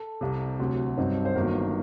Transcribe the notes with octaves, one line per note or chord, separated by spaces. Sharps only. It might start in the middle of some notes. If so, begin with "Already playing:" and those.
Already playing: A4
C2 C3 G3
D2 C3 F#3
G2 F#3 C4 D#4
C5
G1 G2 D#3 F#3 A#3 A#4